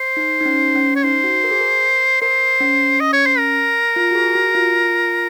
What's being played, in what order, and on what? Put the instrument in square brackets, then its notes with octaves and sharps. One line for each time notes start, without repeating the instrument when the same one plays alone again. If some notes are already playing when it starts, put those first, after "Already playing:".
Already playing: [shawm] C5
[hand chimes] D#4
D#4
C#4
C#4
[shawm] C#5
[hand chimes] D#4 [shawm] C5
[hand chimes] F#4
A#4
G#4
A#4
[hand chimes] A#4 [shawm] C5
[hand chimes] C#4
[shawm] D#5
C#5
C5
A#4
[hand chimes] F4
F#4
G#4
F#4
F4